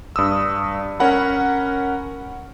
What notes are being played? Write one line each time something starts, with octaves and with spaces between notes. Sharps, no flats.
G2 D#6 E6
C#4 A#4 F#5 B5